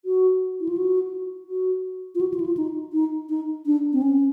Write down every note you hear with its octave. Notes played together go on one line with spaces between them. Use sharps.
F#4
E4
F4
F#4
F#4
F4
F#4
F4
E4
F4
D#4
D#4
D#4
D4
C4
C#4